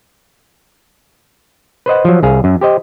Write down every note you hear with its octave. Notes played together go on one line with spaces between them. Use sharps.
B4 C5 D#5 F#5
F3 F#3
C2 G#4 F5
F#2
G4 C5 D#5